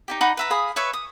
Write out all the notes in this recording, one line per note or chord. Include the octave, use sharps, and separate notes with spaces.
D#4 E4 G4
D#4 F#5 B5
B4 E5 A#5
G#4 F5 B5 D#6
B4 C#5 E5 C#6
D#6